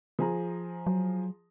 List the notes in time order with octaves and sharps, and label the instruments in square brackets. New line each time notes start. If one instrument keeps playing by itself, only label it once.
[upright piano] F3 G#4 A#5
[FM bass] F#3